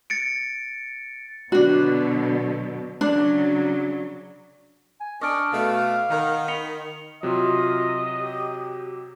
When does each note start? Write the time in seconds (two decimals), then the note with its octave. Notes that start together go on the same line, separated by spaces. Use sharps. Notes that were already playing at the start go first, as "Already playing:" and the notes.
0.10 A6 C#7 D7
1.52 B2 D3 F#3 D4 F#4
3.01 C#3 F#3 D4
5.01 G#5
5.21 D4 D#5 A5 C#6 D6 F6 D7
5.53 B2 A3 F5
6.10 D#3 D#4 A#4 F#5
6.48 B5 C#7 F7 G7
7.23 C3 F#3 F4 D#5
8.20 G4